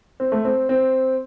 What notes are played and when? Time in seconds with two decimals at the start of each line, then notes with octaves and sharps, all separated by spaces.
0.20 C4
0.32 A3
0.45 C4
0.69 C4